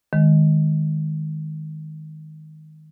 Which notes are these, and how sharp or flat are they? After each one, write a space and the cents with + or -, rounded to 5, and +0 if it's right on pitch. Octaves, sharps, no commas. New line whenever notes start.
D#3 +0 G#3 +0